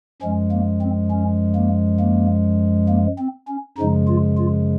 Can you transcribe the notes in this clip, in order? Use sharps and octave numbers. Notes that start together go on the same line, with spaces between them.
F#2 F3 G#3 C#4
A#3
C4
C#4
A#3
A#3
A#3
C4
C#4
F#2 C#3 F3 G#3 D#4
F4
F4